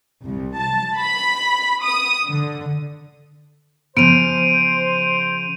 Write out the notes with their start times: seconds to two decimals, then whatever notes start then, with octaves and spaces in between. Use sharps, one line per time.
0.25 C2
0.58 A5
0.99 B5
1.84 D#6
2.28 D3
3.97 C#3 F3 B3 C5 D7 D#7 F7